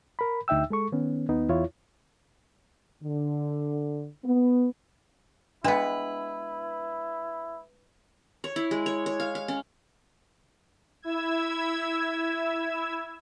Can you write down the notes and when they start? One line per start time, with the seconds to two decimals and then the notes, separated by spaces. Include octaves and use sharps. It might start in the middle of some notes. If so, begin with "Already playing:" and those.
0.19 A#4 B5
0.48 D2 D#4 E5 G5 E6
0.70 G#3 A4 C#6
0.92 D#3 B3 C#4
1.29 D#2 B3 D#4
1.49 E2 E4 F4 C#5
3.03 D3
4.24 B3
5.64 G#3 B3 D4 E4 B4
8.44 C#5
8.56 E4
8.71 G#3
8.86 C#5
9.06 C#5
9.20 F5
9.35 F5
9.48 C#4
11.02 E4 E6 G#6